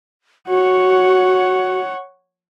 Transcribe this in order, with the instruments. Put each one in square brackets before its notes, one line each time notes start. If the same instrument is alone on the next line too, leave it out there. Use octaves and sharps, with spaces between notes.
[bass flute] F#4 [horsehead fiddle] C#5 F#5